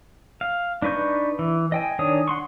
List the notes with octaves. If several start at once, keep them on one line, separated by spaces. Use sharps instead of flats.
F5
D4 D#4 B4 C#6 G6
E3
D#5 G5 G#5
D#3 D4 C#5 G#5 D#6
F#5 C6 C#6